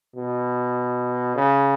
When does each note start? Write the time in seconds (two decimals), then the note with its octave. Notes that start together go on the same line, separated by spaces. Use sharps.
0.16 B2
1.36 C#3